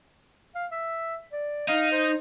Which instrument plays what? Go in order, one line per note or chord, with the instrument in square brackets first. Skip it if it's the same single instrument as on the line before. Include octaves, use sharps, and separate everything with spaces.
[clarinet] F5
E5
D5
[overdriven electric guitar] D#4 [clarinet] F5
[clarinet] C5